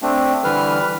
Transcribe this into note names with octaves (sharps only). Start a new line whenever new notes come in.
A3 C4 D4
D3 E3 G3 B4 F6